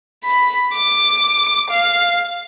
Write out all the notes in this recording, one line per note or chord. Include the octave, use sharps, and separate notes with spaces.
B5
D6
F5